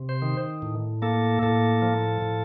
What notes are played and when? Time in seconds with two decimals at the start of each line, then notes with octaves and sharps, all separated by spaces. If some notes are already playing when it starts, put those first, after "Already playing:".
Already playing: C3
0.09 C5
0.22 D#3
0.62 A2
1.02 A#3 A4
1.42 A2 A4
1.82 F3
2.22 A2